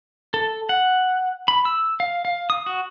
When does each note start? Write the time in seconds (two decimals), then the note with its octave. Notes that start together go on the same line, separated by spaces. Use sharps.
0.34 A4
0.69 F#5
1.48 B5
1.65 E6
2.00 F5
2.25 F5
2.50 D#6
2.66 F#4